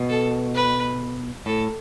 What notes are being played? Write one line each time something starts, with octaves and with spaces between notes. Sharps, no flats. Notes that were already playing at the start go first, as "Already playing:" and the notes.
Already playing: B2
A4
B4
A2 A4